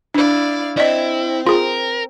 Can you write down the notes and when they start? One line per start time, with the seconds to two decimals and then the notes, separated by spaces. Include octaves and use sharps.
0.14 D4 E4 D5 F5
0.77 C4 E4 D5 D#5
1.47 F4 G#4 A#4